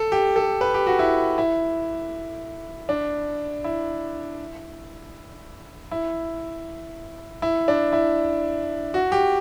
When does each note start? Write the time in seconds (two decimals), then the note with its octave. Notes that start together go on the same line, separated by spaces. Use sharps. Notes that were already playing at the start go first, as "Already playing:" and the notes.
Already playing: A4
0.12 G4
0.36 A4
0.61 B4
0.74 G4
0.87 F#4
0.99 E4
1.38 E4
2.89 D4
3.64 E4
5.91 E4
7.42 E4
7.68 D4
7.93 E4
8.94 F#4
9.12 G4